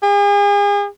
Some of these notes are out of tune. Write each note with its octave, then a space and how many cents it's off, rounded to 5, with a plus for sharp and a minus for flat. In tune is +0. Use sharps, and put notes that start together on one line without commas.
G#4 -40